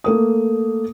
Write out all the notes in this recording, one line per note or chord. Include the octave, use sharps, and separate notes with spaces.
A3 A#3 D#6